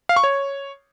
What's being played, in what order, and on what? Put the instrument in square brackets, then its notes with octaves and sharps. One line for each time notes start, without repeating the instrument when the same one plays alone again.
[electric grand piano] F5
C#6
C#5